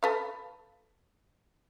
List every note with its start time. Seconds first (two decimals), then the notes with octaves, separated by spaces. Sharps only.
0.03 A4 B4 F5